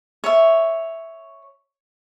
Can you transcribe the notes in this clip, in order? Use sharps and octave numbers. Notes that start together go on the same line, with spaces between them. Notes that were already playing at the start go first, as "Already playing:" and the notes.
C#5 E5